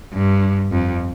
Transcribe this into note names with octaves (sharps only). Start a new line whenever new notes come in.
G2
F2